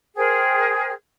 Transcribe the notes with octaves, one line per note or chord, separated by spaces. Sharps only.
G#4 A#4 C5 G5